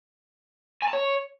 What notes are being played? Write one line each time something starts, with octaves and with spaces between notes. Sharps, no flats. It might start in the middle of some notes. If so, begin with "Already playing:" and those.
G#5
A5
C#5